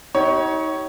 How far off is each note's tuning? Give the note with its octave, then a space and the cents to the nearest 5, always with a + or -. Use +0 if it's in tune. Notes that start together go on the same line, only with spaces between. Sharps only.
D#4 +35 G4 -40 C#5 +0